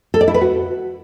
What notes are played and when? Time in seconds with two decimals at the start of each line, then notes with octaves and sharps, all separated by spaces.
0.14 A4
0.21 D5
0.28 E4
0.34 B4
0.41 F#4